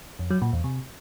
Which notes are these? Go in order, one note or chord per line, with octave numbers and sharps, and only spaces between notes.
F2
F#3
A#2
E2
C3